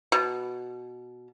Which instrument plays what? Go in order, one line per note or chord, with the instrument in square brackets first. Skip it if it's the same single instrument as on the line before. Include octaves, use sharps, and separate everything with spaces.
[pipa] B2